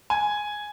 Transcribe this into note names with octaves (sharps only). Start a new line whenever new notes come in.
G#5